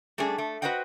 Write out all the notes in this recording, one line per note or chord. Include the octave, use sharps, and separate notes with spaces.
G3 A3 C#4 D4 G#4
A3
F#4 B4 C5 D#5 F#5 G5